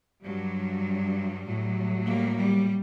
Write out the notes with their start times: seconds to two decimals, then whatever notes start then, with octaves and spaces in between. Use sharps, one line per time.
0.23 G2 F#3 G3
1.46 A2 F#3
2.07 G3 A#3
2.38 G3